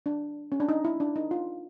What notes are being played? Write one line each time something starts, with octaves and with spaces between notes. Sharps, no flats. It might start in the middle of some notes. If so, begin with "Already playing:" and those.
D4
C#4
D4
D#4
E4
D4
D#4
F4